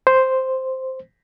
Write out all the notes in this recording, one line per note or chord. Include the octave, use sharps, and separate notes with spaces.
C5